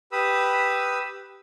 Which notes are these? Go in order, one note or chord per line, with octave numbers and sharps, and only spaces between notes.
G4 B4 B5 D#6 E6